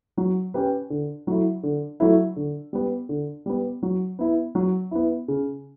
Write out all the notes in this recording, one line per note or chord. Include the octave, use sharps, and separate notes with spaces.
F#3
C#4 G4 B4
D3
F#3 A3 E4
D3
F#3 A3 E4
D3
G3 B3
D3
G3 B3
F#3
B3 E4
F#3
B3 E4
C#3